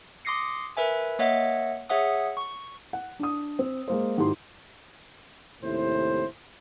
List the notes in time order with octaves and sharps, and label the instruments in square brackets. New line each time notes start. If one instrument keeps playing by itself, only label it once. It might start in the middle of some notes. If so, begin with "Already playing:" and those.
[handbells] C6 D6 D#6 A#6 C7 C#7
A#4 B4 E5 G#5
A#3 C#5 D#5 E5 F#5
G#4 C#5 E5 F#5 D#6
C#6
[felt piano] F#5
D4 D#6
C4
G#3 A#3 C5
G#2 D#3 E4 F#4 G4 C6
[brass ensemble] D#2 A2 C3 E4 C5